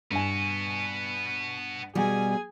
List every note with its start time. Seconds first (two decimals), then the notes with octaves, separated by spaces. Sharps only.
0.11 G2 B3 F#4 G#5
1.95 B2 G3 G#4 G#5